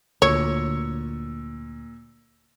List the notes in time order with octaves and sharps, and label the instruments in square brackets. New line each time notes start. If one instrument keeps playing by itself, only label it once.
[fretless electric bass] D2 D3 [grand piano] A#2 E6 C#7 [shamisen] C#5